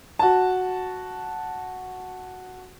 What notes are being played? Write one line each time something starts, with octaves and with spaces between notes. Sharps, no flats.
F#4 A5